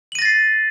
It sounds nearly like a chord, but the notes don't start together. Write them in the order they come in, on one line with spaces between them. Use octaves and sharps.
F#7 D#7 A#6 A6 C7